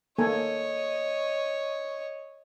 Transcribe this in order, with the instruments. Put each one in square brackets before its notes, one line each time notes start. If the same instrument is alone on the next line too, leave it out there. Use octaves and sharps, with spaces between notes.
[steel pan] A#3 A4 G#5 [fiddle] C#5 D#5